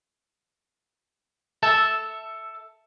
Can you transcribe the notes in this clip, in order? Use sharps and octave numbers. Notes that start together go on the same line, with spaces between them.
A4 E5 A5